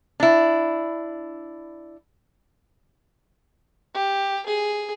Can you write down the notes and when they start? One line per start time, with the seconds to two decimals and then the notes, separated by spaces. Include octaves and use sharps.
0.20 D4 E4
3.95 G4
4.46 G#4